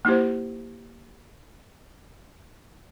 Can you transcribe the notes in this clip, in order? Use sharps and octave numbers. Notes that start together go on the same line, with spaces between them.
A#3 D#4 E4 G4 C5